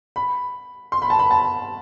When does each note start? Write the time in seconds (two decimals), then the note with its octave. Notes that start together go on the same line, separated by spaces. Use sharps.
0.16 B5
0.92 C6
1.02 B5
1.10 A5
1.19 B5
1.31 A5